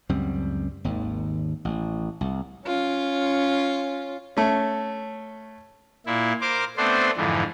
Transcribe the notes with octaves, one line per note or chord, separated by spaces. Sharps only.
C#2 F#2 G3 C4
G#1 D#2
A1
C2
C#4 F4
A3 C#4
A#2 E4
A#4 C5 D6
A3 B3 C4 D4 C5
F2 G#2 D3 E3